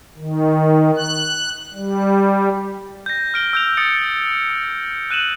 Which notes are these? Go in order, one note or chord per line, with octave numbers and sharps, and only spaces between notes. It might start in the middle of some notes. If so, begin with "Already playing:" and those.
D#3
F#6
G3
G6 A#6
F6 D7 G7
E6 G6 F7
D#6 A6 C#7 D7
F#6 D#7 E7 F#7